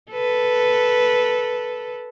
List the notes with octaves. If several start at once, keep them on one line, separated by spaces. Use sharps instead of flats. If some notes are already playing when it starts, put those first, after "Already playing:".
A4 B4